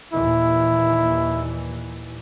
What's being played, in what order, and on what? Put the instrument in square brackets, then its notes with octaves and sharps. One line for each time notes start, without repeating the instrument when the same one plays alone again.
[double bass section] D#2 A#2 E3 [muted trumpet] E4